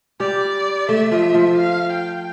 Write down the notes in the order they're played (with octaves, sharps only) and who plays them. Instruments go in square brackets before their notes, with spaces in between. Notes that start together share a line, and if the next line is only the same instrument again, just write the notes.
[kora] G3 G4 [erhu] D5
[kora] A3 A4 [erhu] E5
[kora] F3 F4
F3 F4
[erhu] F5
G5